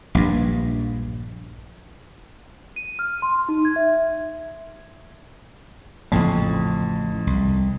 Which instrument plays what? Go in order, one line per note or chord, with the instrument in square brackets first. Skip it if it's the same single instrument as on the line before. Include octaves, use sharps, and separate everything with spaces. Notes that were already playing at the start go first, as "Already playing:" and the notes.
[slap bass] A#1 G2
[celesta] D#7
F6
C6
D#4
G#6
E5
[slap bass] A1 A2 C#3 [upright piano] F2
[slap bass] C2